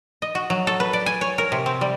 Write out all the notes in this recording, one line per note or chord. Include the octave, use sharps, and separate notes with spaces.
D#5
F#4
F#3
A4
B4
D5
G#5
C#5
A#4
C3
C4
G3